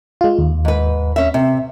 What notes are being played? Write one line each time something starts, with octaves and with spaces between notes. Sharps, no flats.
G#3 F4
D#2
G#2 B4
C#4 E5
C3